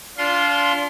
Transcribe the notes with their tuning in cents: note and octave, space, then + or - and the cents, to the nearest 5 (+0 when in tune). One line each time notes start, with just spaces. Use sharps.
D4 -30 F4 +0 C6 +0